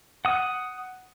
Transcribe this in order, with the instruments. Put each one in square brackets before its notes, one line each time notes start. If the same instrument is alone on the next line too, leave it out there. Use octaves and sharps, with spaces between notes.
[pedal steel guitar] F#5 D#6